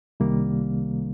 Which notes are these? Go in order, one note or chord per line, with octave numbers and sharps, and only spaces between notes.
C2 C3 D#3 G3 A#3